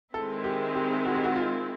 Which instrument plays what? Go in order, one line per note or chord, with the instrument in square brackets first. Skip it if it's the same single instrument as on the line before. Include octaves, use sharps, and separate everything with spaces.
[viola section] D#3 G#3 C4 E4 [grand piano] A4
[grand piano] G4
G4
F#4
G4
F#4
F4